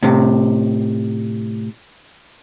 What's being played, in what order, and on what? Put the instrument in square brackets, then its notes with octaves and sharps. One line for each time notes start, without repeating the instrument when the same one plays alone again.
[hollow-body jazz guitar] A2 C3